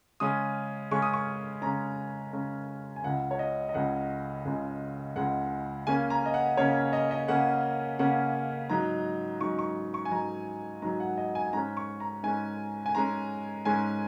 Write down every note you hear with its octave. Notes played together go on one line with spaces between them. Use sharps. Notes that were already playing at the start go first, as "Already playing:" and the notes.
C#3 G#3 C#4 D#6
C#3 G#3 C#4 C#6
D#6
C#6
C#3 G#3 C#4 A#5
C#3 G#3 C#4
G#5
C#2 C#3 G#3 F#5
C#5
D#5
D#5
C#2 C#3 G#3 F#5
C#2 C#3 G#3
C#2 C#3 G#3 F#5
C#3 A#3 C#4 G#5
A#5
D#5
F#5
C#3 A#3 C#4 C#5
D#5
D#5
C#3 A#3 C#4 F#5
C#3 A#3 C#4 F#5
G#2 F#3 D#4 A#5
G#2 F#3 D#4 C#6
C#6
C#6
G#5
G#2 F#3 D#4 A#5
G#2 F#3 D#4 A#5
F#5
D#5
G#5
G#5
G#2 G#3 C#4 A#5
C#6
A#5
G#2 G#3 C#4 G#5
G#5
G#2 G#3 C#4 A#5
G#2 G#3 C#4 G#5